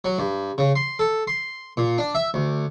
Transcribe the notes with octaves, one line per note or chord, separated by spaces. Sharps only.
F#3
G2
C#3
C6
A4
C6
A#2
D4
E5
D2